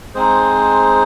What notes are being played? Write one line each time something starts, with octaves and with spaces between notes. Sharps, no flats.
G#3 C4 D#4 G#4 C5